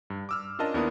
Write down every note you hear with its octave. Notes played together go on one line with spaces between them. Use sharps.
G2
D6 E6 F6
C#4 D4 F4 A#4 D#5 A5
D#2 B3 D4 E4 A#4 D#6